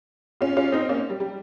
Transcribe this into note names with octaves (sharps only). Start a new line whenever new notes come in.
C#4 F4
C#4 F4
C4 D#4
A#3 C#4
G3
G3